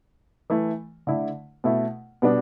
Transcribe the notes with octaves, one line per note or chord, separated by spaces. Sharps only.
E3 A3 E4
D3 A3 E4
B2 A3 E4
B2 G3 B3 D4